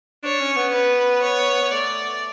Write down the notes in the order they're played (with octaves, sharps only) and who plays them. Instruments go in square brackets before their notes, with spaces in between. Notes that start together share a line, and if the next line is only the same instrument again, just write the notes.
[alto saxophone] D4 [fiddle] C#5
[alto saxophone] C#4
B3
[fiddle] B4
C#5
[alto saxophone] B3
[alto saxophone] A3 [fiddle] D5